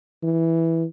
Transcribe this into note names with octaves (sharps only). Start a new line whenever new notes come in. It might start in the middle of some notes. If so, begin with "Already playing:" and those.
E3